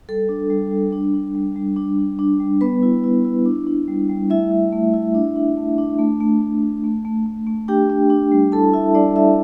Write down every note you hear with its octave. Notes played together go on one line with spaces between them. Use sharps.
G3 A4
D4
G3
G3
D4
D4
G3
G3
D4
D4
D4
G3
G3 B3 B4
E4
E4
E4
D4
D4
G3
G3
A3 E4 E5
E4
A3
E4
D4
D4
A3
D4
A3
A3
A3
A3
A3
A3
A3
A3
D4 G4 G5
D4
D4
G3
E4 A4 A5
E4 E5
G3 D4 D5
E4 E5